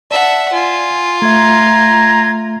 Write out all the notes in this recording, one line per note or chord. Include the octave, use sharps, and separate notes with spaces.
D5 E5 F#5 A5
F4 G#5
A3 E5 A#5 G#6